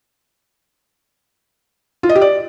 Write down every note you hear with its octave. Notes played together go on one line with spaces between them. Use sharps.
F4
D#5
G4
D5